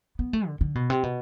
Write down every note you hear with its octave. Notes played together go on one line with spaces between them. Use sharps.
B3
A3
D3
D3
B2
C3
B2